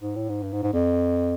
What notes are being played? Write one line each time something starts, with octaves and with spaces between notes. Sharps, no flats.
G#2
A2
G#2
G2
G#2
G#2
F2